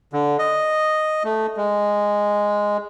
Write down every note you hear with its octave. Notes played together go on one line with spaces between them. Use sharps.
D3
D#5
A3
G#3